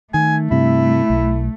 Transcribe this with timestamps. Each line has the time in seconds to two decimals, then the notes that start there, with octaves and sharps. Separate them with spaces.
0.14 D#3 A3 G#5
0.51 G2 C3 E4
1.10 B1